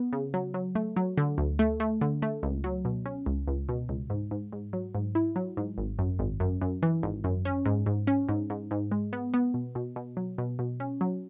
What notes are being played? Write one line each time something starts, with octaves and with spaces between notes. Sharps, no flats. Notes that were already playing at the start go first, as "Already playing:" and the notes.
Already playing: B3
C#3
F#3
F#3
A3
F#3
D3
D2
A3
A3
D3
A3
C#2
F#3
B2
C#4
C#2
C#2
B2
C#2
G#2
G#2
G#2
F#3
G#2
E4
F#3
G#2
G#1
F#2
G#1
F#2
F#2
E3
G#1
F#2
C#4
G#2
G#2
C#4
G#2
G#2
G#2
G#3
B3
B3
B2
B2
B2
F#3
B2
B2
C#4
F#3